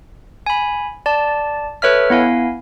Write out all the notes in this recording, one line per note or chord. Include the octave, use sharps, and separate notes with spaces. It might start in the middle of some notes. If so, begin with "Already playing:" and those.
G#5 B5
D5 A5
A4 B4 C#5 E5 F6
B3 E4 F5 G#5